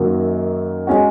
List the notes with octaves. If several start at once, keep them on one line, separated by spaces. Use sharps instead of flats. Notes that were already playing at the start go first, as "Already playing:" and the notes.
Already playing: F#2 D#3 F#3 A#3
G#3 C#4 F#4